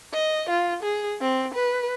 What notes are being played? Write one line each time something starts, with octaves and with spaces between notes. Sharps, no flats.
D#5
F4
G#4
C4
B4